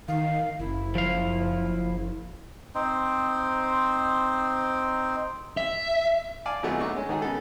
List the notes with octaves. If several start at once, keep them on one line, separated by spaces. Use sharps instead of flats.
D#3 F5
F#1 E4
F3 F5
C4 D#4 C5
E5
D5 F5 G#5 A5
G#1 A#2 F#3 A3 B3 G#4
A3 B3 D4 D#4 F#4 C#6
G#3 C#4
D3 D#3 A3 D#4 F#4 G#4
C#3 B3 G#4 A4